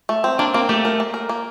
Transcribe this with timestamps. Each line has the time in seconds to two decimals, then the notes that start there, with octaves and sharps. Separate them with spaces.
0.09 A3
0.24 C4
0.39 A#3 D4
0.54 A#3 C4
0.69 A3 G4
0.85 A#4
1.00 A#3
1.14 A#4
1.29 A#3